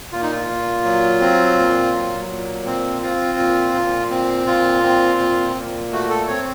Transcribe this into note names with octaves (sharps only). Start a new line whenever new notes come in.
A#2 F4
D#4
F4
A#2
F#3
C4
A#2
F#3
A#2
C4
C4 F4
A#2
A#2
C4
A#2 F4
C4
A#2
A#2
A3 F#4
A4
C4 C#5